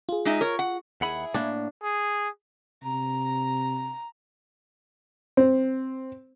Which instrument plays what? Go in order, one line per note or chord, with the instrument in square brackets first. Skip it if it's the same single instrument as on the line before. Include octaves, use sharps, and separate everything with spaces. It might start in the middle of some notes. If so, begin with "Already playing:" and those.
[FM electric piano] F4 G#4
[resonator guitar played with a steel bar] G#3 D#4 E5
A#4 C#5
F#5
[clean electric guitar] D#2 F#5 B5 [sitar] E4 G#4
[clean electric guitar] A2 A#3 [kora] D4
[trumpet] G#4
[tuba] C3 [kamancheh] A#5
[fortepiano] C4